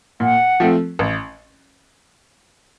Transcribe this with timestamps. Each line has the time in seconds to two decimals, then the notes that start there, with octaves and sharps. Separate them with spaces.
0.20 A#2 F#5
0.60 F3 A3 C4
0.99 A1